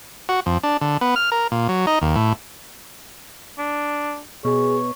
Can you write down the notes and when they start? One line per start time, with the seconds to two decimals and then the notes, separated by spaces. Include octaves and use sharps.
0.29 F#4
0.46 F2
0.63 D4
0.81 D3
1.01 B3
1.16 F6
1.32 A#4
1.52 A#2
1.69 F#3
1.87 D#4
2.02 D#2
2.16 A2
3.58 D4
4.45 B2 G#4 C#5